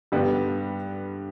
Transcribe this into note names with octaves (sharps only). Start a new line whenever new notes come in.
G2 D3 G3 B3